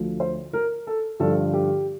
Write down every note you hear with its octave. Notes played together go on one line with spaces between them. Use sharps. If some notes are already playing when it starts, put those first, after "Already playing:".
Already playing: D2 D3 F3
C5
A#4
A4
G2 D3 F3 A4
G4